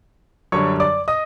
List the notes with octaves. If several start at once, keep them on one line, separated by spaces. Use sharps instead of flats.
F#2 D3 G3 C#5 C#6
D5 D6
D#5 D#6